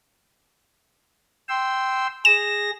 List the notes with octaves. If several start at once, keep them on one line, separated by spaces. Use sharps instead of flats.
G5 C6 E6
G#4 A#6 E7